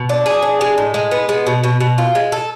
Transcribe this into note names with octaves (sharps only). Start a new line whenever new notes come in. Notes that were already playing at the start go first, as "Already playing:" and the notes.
Already playing: B2
D4
G#4
D4
G#3
A2
G#3
B3
G#3
B2
B2
B2
F4
G#3
A4